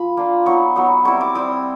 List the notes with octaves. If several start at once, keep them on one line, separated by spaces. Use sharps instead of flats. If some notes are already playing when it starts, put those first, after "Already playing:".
Already playing: F3 B5
A#3 D4 F4
F#3 B3 D#4 C#6
F#3 B3 D#4
G3 C4 E4 C#6
D6
G3 C4 E4 D#6